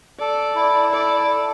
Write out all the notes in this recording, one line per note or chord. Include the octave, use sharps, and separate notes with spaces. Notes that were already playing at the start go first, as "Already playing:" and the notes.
A4 D5
E4
A4 D5
A4